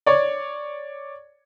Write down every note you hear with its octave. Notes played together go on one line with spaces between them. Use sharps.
C#5 D5